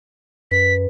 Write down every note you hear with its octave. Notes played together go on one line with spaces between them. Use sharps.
F#2 B4 B6